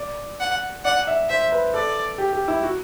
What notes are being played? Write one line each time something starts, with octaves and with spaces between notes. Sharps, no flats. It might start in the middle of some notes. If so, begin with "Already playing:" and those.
Already playing: D5
F#5
D5 F#5
E5
C5 E5
B4
A4 D5
G4
G4
E4
F#4